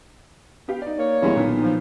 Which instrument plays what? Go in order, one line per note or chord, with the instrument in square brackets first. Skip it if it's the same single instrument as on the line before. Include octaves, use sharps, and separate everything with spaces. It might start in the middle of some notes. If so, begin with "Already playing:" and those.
[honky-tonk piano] B3 G4 F5
D#4 D5
[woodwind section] A#3 C#5
[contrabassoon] E2 [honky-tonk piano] G2 G3 G#3
[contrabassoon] B1 [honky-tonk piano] A#2 D#3 B3
[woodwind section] F3